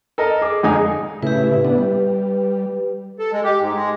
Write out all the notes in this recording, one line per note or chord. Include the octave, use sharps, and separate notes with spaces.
A4 A#4 D#5
G#4 D6
F2 D3 G#3 D#4 G#5 D#6
A2 C#3 E4 G4 B4
B3 D4
G3
A4
G#3
G4
G#2
G#3